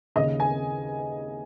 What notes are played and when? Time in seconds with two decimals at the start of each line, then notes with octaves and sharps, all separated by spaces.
0.16 D#2 C#3 D#5
0.40 G#5